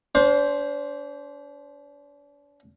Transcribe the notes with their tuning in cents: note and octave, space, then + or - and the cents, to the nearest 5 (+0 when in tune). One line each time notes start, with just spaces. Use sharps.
D4 -40 C5 +0